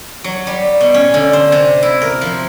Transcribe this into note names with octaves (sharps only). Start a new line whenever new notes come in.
F#3
G3
B2
C#4
D3
C5
C3
E4
A#4
F3